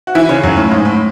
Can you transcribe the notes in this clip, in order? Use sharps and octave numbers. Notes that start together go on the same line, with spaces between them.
F#4
E3 E4
C#3 C#4
F#2 F#3
A2
G#2
A2